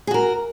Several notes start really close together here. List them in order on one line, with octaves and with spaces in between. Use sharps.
G#4 F#4 A#4